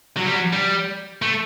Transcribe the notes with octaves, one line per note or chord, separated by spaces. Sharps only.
F#3
G3
F#3
G3
A3